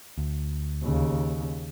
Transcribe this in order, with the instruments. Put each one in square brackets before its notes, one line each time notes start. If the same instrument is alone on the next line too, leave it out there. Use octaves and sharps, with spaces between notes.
[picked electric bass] D2
[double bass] D#2 C#3